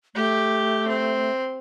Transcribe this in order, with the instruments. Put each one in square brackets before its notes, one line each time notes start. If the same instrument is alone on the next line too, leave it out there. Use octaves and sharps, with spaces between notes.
[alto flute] A3 [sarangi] G4
[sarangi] C4